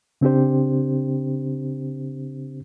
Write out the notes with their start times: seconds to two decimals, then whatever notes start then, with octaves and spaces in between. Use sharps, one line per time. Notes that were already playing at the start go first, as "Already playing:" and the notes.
0.21 C#3 C4 D4 G4 C5